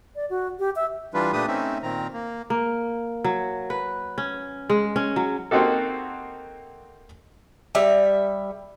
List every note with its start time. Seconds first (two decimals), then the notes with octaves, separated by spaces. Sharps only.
0.16 D5
0.30 F#4
0.59 G4
0.76 E5
1.14 E3 G3 D4 F4 B4
1.33 A#2 A3 D4 G4 B4 D#6
1.48 A3 C4 C#4 D#4 E5
1.83 A#2 D#3 C4 A#5
2.13 A#3
2.50 A#3
3.24 F#3
3.70 B4
4.18 C#4
4.70 G#3
4.96 C#4
5.16 F#3
5.51 A#3 C4 D#4 F#4 G4 A4
7.75 G3 E5